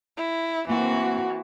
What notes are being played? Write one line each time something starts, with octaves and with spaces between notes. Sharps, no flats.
E4
E3 A#3 C4 F#4